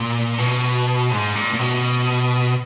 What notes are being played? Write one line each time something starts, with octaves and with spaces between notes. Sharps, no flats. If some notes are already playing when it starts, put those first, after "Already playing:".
Already playing: A#2
B2
G#2
A#2
A#2
B2